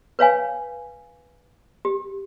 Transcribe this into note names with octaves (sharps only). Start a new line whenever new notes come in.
B4 C#5 F5 G#5
G4